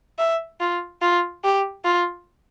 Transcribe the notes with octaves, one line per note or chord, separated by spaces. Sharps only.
E5
F4
F4
G4
F4